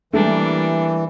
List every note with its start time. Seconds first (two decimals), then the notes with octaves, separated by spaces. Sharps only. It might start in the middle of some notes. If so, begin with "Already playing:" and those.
0.13 E3 G3 A3 A#3 D4